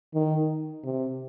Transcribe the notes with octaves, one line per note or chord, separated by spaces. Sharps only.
D#3
C3